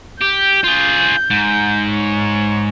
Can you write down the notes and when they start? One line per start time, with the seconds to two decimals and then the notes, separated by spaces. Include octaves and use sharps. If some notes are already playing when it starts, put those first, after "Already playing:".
0.22 G4 G6
0.64 F4 G#4
1.31 G#2
1.90 C#5